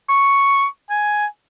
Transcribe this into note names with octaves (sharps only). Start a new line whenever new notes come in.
C#6
G#5